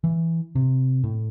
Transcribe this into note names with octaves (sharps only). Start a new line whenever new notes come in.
E3
C3
A2